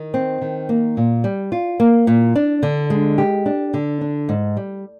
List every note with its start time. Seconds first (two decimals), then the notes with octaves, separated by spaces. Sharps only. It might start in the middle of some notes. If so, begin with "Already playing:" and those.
Already playing: D#3
0.14 C4
0.42 D#3
0.69 A#3
0.97 A#2
1.24 G3
1.52 F4
1.80 A#3
2.07 A#2
2.36 D4
2.63 D3
2.90 G#3
3.18 G4
3.46 D4
3.74 D3
4.01 D4
4.29 G#2
4.57 G3